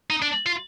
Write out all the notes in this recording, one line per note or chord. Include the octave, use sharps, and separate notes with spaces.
D#4
D4
F4